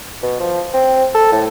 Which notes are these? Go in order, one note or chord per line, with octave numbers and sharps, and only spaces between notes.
B2
F3
C4
A4
A2